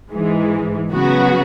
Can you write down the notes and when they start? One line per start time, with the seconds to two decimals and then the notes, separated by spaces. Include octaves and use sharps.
0.11 G#2 E3 G#3
0.92 C#3 F#3 B3 F#4